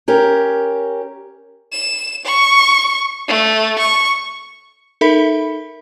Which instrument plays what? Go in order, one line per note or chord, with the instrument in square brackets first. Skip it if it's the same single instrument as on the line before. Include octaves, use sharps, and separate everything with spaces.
[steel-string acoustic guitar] C#4 G4 A#4
[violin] E7
C#6
A3
C#6
[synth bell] D#4 A4 A#4 E5 B5 B6